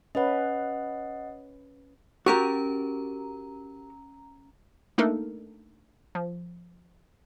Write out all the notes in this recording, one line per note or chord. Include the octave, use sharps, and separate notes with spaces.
C#4 B4 D#5 F#5
C#4 F#4 G4 A#4 A#5
A3 A#3 D4 D#4 A4 A#4
F3